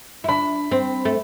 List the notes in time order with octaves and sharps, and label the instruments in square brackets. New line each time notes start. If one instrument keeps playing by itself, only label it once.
[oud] E4
[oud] D4 [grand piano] B5
[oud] C4
A3